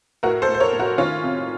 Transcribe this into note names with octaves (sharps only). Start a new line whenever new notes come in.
A2 F#4 A#4
A4 C5
A2
C5
A#4 C#5
A2
F#4 A#4
D#3 C#4 F4
C3